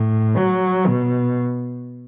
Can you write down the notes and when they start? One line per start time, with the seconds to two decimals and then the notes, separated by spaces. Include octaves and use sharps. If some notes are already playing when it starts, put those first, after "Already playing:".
Already playing: A2
0.37 F#3
0.87 B2